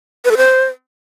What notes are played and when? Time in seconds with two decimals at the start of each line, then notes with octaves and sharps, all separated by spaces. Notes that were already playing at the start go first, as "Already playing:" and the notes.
0.25 B4
0.31 A4
0.37 C5